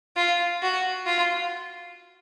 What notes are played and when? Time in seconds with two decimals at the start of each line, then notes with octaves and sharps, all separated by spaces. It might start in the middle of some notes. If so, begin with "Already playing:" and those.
0.17 F4
0.62 F#4
1.06 F4